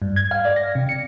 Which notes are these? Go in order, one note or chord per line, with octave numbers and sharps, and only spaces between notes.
G2
G#6
F5
D5
A#6
C3
C#7